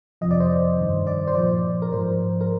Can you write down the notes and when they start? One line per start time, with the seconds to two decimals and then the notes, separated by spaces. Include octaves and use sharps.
0.21 F2 C3 F3 D#5
0.31 D5
0.40 C5
0.78 G2 D#3
1.07 D5
1.27 C5
1.35 A#2 F3 D5
1.82 A#4
1.92 G#2 F3 C5
2.41 A#4